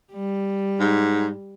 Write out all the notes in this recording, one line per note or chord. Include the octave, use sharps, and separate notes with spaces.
G3
G#2